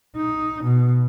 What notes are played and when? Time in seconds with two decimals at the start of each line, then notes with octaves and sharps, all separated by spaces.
0.16 D#4
0.64 B2